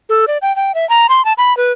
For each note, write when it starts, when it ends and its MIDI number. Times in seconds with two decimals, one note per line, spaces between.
0.09 0.25 69
0.27 0.38 74
0.42 0.54 79
0.56 0.75 79
0.75 0.88 76
0.90 1.07 82
1.09 1.24 84
1.25 1.33 81
1.38 1.56 83
1.57 1.72 71